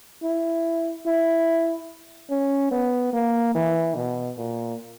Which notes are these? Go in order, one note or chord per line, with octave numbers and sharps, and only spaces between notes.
E4
E4
C#4
B3
A#3
E3
B2
A#2